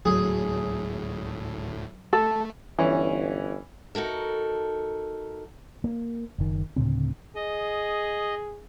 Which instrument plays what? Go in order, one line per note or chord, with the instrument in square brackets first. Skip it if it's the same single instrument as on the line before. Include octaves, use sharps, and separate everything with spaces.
[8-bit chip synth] D2 A2 [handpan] F#3 [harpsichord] G#4
[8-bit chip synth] A3 [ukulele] A4 A5
[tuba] G1 [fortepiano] E3 C#4
[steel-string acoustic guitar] D#4 F#4 A4 A#4
[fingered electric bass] A#3
F#1 D#3
D2 A2 C#3 C4
[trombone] G#4 [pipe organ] D#5